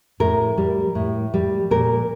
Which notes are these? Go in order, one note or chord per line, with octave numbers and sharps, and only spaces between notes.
A2 A#4
G3
A2
G3
A#2 A#4